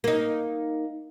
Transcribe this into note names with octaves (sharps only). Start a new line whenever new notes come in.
A#3 D#4